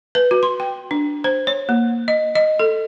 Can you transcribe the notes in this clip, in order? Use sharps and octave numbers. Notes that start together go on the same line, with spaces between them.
B4
F#4
C6
G5
D4
C5
C#5
A#3
D#5
D#5
A4